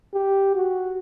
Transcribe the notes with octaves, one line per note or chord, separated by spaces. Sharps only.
G4
F#4